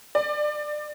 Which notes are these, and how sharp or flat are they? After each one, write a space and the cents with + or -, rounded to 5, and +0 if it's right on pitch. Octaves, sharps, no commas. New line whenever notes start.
D5 +20